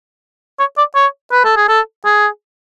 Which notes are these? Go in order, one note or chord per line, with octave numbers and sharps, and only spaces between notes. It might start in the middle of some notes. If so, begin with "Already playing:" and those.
C#5
D5
C#5
B4
A4
G#4
A4
G#4